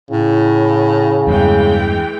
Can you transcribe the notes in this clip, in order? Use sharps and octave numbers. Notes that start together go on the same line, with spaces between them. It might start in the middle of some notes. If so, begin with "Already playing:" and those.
A2 C#3
E2 G2 E3 G#3 G5